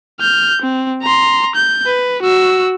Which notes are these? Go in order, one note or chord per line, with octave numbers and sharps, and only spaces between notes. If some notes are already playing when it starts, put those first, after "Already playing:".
F6 G6
C4
A#5 C6
G6
B4
F#4 E6